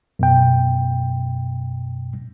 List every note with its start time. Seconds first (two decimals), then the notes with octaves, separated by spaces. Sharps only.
0.19 F#2 B2 G5